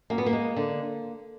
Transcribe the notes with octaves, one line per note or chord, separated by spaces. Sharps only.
F#2 A#3
B3
A#3
G#3
D3